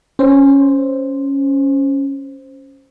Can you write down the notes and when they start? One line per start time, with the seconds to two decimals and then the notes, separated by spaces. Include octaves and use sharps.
0.19 C#4 C5